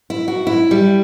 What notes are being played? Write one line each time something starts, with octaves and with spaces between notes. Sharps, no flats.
E4
F#4
E4
G3